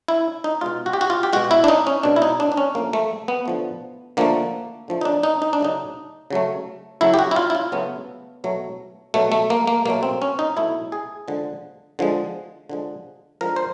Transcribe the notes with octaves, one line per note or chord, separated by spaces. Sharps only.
E4
D#4
B2 G#3 F4
F#4
G4
F#4
F4
G4
B2 G#3 F#4
E4
D4
D#4
C#4
B2 G#3 D4
E4
D#4
D4
D4
C#4
D3 F3 A3 A#3
A3
B3
D3 F3 A3
D3 F3 A3 A#3
D3 F3 A3
D#4
D4
D#4
D#4
D4
C#3 F#3 A3 D#4
C#3 F#3 A3
C#3 F#3 A3 E4
G4
F#4
E4
F4
E4
F4
C#3 F#3 A3 B3
B2 F#3 A3
B2 F#3 A3
A3
A#3
A#3
B2 F#3 A3 A#3
C4
C#4
D#4
B2 F#3 A3 E4
G#4
D3 F3 G#3
D3 F3 G#3
D3 F3 G#3
D3 F3 G#3 A#4
C5